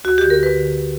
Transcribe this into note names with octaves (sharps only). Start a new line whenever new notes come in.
D2 F#4
D3 G4
A#4
D2 B4
D3
D3